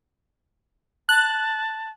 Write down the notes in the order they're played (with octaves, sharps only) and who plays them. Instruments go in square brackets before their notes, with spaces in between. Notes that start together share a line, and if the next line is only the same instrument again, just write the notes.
[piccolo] A5 [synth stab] F#6